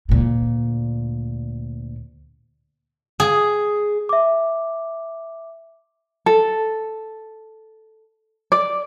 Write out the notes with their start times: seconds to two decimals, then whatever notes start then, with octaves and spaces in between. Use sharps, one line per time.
0.09 D2 A#2
3.20 G#4
4.09 E5 D6
6.26 A4
8.52 D5